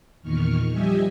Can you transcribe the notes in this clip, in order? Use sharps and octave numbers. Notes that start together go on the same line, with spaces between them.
E2 A#2 D#3 C#6 F6
F3 G3 G4 D#5 E5 G#5